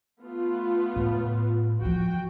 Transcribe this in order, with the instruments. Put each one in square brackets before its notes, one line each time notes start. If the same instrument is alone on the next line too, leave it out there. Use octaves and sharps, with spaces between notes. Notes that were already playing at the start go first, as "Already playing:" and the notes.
[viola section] A3 B3 F4
[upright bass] A2
[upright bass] E3 F3 [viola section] F#4 G5